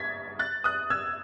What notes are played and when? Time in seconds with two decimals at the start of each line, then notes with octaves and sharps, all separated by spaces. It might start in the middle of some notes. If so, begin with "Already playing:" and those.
Already playing: G#6 A6 B6
0.39 F#6 A6
0.64 D#6 F#6
0.90 E6 G#6